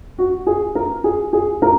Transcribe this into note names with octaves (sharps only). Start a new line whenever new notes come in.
F#4
G#4
A#4
G#4
G#4
A#4